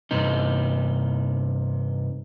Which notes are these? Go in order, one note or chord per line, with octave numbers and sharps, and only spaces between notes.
G2 C3 D#4